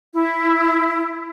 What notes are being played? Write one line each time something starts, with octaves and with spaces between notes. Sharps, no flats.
E4